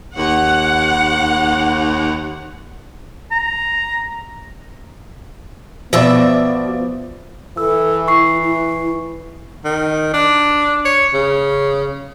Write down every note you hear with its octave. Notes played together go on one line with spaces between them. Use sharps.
D#2 F#5
A#5
B2 F3 B3 D5 E5
E3 A4 E6
E4 C#6 C7
E4
D#3
D4
C#5
C#3